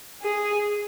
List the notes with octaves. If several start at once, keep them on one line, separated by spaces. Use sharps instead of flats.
G#4